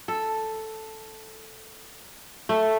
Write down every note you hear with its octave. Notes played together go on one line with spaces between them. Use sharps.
A4
A3